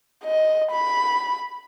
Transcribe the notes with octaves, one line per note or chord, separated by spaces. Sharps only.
D#5
B5